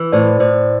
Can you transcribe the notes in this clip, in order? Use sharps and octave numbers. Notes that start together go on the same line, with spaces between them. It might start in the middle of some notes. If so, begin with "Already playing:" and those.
Already playing: E3
A2 C5 D5
A2 C5 D5